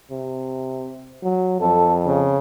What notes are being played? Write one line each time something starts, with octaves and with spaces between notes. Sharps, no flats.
C3
F#3
F2 A4
C#3